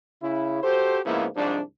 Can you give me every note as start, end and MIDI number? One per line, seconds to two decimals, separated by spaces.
0.22 0.62 49
0.22 0.62 64
0.63 0.99 66
0.63 0.99 67
0.63 0.99 69
0.63 0.99 72
1.06 1.27 44
1.06 1.27 49
1.06 1.27 53
1.06 1.27 58
1.06 1.27 59
1.06 1.27 64
1.36 1.61 36
1.36 1.61 44
1.36 1.61 53
1.36 1.61 62